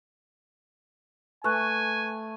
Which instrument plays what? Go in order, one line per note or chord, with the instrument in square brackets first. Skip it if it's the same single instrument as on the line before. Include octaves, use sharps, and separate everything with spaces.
[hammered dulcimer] A3 [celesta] B4 C#6 F#6 [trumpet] G#5